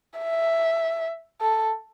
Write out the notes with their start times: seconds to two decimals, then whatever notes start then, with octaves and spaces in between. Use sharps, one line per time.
0.19 E5
1.41 A4